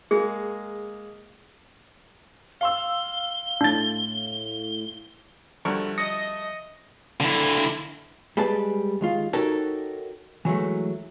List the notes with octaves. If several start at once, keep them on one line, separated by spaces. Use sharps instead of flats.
G#3 A#3 G#4
F5 C6 E6 G7
A2 D4 A6
D3 F3 G3 A3 F#4 A#4
D#5 D#6 A#6 C#7
D3 E4
G3 G#3 G#4 B4 D5 A5
D#2 G#3 F4
D#4 F#4 G4 A4 A#4 C#5
E3 F#3 G#3 A3